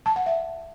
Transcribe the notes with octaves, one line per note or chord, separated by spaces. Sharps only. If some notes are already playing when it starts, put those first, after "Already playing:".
A5
F#5
E5